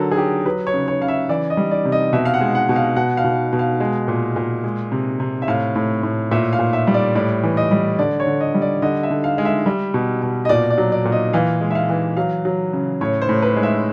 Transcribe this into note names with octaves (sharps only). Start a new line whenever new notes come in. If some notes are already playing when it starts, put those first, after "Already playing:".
Already playing: D3 F#3 A4 A#4
G#4
F#3 G4
F#3 B4
C#5
C#3
C#5
C#3 F5
E5
E3 D5
D#5
G3
D5
C3
D#5
B2 E5
F5
F#5
G#3
F#5
B2
F5
B2 F#5
F5
B2
B2
F5
G#3
A#2
A#2
G#3
C3
C3
E5
A2 F5
A2
A2
A#2 E5
F5
A#2
E5
G3
D5
A2 D5
E3
D#5
G3
D3 D5
C#5
D3
D#5
G3
D5
D3 D#5
E5
D3
F5
G#3 F5
E5
G3
B2
B2
D#5
A#2 D5
D5
F#3
D5
A#2
D#5
E3 F5
G#3
E5
F5
E3
F#3 F5
F#3
C#3
A2 C#5
C5
A2
B4
G#3
E5